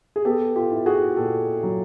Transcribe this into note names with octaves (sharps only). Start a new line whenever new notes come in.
G#4
B3 G4 A4
F4 G4
E4
F#4 G#4
A#2 G4 A4
F#3